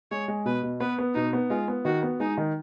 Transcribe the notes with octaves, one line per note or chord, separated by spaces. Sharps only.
G#3 C#5
G#3
B2 B4
B2
B3 B4
B3
B2 D#4
B3
G#3 F4
B3
D#3 F#4
B3
G#3 D#4
D#3